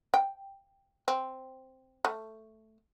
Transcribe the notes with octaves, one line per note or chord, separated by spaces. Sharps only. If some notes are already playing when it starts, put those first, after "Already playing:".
G5
C4
A3